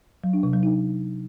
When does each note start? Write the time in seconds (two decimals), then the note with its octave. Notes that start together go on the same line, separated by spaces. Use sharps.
0.24 F#3
0.33 D4
0.43 C3
0.53 F#3
0.63 D#4